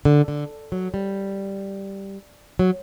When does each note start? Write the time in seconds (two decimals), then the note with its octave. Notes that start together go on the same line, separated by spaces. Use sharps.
0.05 D3
0.28 D3
0.72 F#3
0.94 G3
2.59 F#3